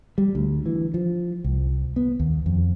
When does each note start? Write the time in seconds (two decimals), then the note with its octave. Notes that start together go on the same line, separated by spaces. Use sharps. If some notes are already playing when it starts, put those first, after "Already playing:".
0.18 G3
0.35 D2
0.66 E3
0.94 F3
1.44 C2
1.96 B3
2.20 D#2
2.46 F2